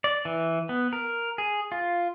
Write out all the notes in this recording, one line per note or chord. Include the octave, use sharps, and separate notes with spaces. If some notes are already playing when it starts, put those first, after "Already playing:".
D5
E3
B3
A#4
G#4
F4